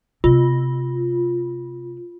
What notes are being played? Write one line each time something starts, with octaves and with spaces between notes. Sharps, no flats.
C3 B3 F4